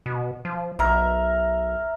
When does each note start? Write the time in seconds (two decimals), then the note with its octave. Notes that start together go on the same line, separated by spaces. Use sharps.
0.06 B2
0.45 F3
0.79 B1 A#4 E5